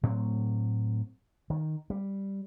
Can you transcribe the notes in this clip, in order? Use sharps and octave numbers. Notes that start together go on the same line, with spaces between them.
A2 F#3 C4
D#3
G3